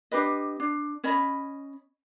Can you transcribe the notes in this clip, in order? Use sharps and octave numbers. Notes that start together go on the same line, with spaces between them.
D4 G4 B4 D#5
D4
C#4 C#5 D#5 B5